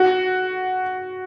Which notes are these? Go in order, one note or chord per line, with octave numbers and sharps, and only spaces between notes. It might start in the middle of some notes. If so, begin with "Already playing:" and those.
Already playing: F#4